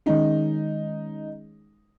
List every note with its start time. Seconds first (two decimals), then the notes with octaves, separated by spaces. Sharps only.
0.06 D#3 G#3 C#4 D#4